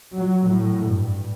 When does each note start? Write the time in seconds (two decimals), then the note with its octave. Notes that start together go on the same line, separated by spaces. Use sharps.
0.16 F#3
0.50 A2
0.87 G2